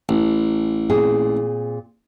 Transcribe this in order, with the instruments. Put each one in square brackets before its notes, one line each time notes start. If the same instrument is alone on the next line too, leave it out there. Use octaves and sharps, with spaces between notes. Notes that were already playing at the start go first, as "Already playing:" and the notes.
[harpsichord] A1
[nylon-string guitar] A#2 C4 G#4